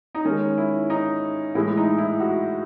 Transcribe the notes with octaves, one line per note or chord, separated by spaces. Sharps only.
D#4
D#3 G#3 C#4
E4
D#4
A2 E3 G#3 E4
D#4
E4
F#4